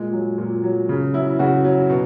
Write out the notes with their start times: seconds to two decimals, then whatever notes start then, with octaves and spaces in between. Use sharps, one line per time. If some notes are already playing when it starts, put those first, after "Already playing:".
Already playing: A#2 G#3
0.13 F#3
0.38 A#2
0.64 F#3
0.89 C#3
1.14 F#3 E4
1.39 C#3 F#4
1.65 F#3
1.90 B2